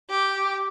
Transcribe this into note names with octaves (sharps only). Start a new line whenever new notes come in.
G4